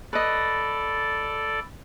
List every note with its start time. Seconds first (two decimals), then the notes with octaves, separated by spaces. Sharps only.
0.13 A4 B4 D5 D#5